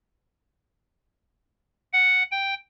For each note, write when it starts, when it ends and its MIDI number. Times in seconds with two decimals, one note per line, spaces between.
1.93 2.23 78
2.31 2.54 79